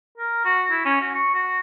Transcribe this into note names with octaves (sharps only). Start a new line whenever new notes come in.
A#4
F#4
E4
C#4
F#4
C#6
F#4